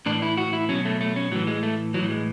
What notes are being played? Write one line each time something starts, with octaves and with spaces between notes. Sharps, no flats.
A2 E3 D4
E4
F#4
E4
B2 F#3 C#4
A3
A3
C#4
A2 E3 F#3
G#3
A3
A2 E3 F#3
G#3